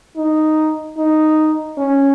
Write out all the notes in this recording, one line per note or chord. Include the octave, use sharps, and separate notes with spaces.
D#4
D#4
C#4